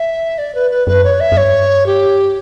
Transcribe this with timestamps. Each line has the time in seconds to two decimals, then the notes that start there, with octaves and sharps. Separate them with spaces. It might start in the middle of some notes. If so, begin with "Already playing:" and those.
Already playing: E5
0.38 D5
0.55 B4
0.71 B4
0.87 F#2 B4
1.04 C#5
1.20 E5
1.32 F#2
1.37 G2 C#5
1.86 G4